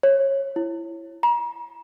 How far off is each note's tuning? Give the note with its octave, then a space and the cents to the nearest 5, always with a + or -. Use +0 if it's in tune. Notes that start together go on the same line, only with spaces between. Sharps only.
C#5 -20
E4 +20
A#5 +40